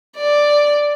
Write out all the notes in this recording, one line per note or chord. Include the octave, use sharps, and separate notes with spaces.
D5